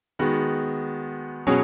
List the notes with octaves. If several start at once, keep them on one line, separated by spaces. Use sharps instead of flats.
D#3 G#3 B3 F#4
B2 F#3 C#4 G#4 C#5